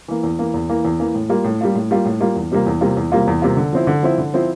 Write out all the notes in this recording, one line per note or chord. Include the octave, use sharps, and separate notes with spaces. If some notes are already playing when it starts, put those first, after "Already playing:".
E3 A#3
E2
E3 A#3
E2
E3 A#3
E2
E3 A#3
A2
G3 A#3 F4
A2
G3 A#3 F4
A2
G3 A#3 F4
A2
G3 A#3 F4
E2
C3 G3 A#3 F4
E2
C3 G3 A#3 F4
E2
C3 G3 A#3 F4
E2
C3 G3 A#3 F4
D3
F3 C4 E4
D3
F3 C4 E4
D3
F3 C4 E4